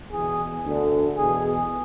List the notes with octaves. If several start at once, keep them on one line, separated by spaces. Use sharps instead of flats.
E2 B2 G#4
D2 D3
E2 B2 G#4